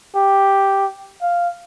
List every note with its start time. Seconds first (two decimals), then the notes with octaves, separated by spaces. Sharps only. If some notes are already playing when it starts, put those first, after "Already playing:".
0.16 G4
1.22 F5